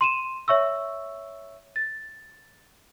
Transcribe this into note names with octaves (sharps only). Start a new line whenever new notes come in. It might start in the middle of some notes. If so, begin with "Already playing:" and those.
C6 D#7 E7
C#5 E5 C#6 E6
A6